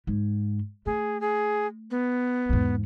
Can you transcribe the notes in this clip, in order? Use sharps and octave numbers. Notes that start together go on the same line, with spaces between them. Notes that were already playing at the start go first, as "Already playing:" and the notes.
G#2
A3 G#4
G#4
B3
E2 G#2